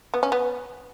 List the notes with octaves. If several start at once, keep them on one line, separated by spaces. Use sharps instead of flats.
B3
C#4
B3